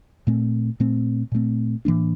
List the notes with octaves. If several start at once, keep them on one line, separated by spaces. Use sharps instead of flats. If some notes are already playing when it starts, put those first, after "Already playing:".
A#2 A3 C4
A#2 A3 C4
A#2 A3 C4
A2 E3 A#3 D4